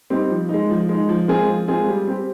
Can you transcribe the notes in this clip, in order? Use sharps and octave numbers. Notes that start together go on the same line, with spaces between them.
G3 C4 D#4
F3
G#3 D#4
F3
G#3 D#4
F3
G#3 C4 F4 G#4
F3
G#3 C4 F4 G#4
G3
C4 G4